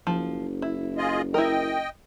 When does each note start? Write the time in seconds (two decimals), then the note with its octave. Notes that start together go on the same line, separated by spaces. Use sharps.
0.07 F#1 F3
0.62 E4
0.97 F4 G#4 D#5
1.34 E4 A#4 D#5 G5